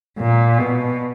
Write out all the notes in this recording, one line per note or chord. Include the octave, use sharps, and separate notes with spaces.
A#2
B2